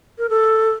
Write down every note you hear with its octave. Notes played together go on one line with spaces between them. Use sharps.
A#4
A4